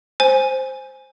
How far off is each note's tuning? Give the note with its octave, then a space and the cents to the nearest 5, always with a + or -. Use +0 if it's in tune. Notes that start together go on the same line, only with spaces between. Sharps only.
C5 +5 G#5 +0